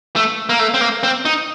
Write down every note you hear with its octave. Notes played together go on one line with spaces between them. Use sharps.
A3
A#3
A3
C4
A#3
C4
D#4